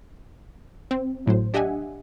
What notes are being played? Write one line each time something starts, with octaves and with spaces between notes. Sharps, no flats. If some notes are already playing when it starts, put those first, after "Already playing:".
C4
G#1 A2 F#3 C5
D4 G4 D#5 E5 F#5 G#5